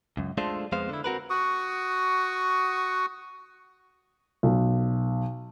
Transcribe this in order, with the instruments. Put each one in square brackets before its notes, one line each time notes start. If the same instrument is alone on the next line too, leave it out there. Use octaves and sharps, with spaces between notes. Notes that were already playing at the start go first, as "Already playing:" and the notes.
[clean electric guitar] C#2 F#2
G#3 A3 D4 F4 A4 C5
F2 G#3 B3 C5 F5
D3 E4
C4 F#4 A#4 B4
[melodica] F#4 C#6 D#6
[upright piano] B1